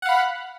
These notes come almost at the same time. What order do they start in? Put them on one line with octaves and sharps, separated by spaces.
F#5 F5 B5